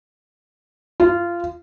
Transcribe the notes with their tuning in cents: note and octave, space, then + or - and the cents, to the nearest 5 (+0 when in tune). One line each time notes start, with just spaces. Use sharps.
F4 -20